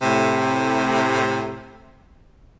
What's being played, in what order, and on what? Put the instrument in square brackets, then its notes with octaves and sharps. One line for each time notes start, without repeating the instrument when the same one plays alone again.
[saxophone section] A2 C3